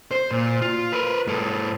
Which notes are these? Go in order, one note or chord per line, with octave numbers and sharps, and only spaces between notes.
C5
A#2
F4
A#4 B4
G#2 A4